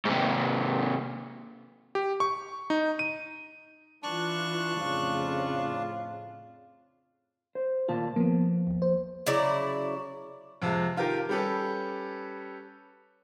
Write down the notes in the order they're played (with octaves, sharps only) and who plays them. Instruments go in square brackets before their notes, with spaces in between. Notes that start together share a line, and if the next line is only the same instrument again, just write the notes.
[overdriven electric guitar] G#2 C3
[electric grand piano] G4
C#6
D#4
D#7
[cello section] E3 F4 [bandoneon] D4 A5 [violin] C#6 F#6
[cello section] F2 A2 C#3 [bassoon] F4
[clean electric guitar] C5
[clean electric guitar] D#2 A#2 A5 [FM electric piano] F4
[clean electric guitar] F3 [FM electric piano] A#3 B3
[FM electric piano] G#1 D#2
C5
[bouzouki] C#3 F#3 E4 D5
[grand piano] F2 C3 G#3 F5 A5
D#3 F4 G4 A#4
G3 C#4 G4 A4 B4